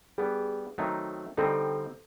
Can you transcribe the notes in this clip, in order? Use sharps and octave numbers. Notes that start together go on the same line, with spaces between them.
G3 B3 D4 G#4
D#3 F#3 A3 C4 D#4
D3 G3 C4 D#4 A4